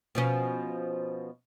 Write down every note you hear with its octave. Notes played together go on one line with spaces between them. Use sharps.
B2 F3 C#4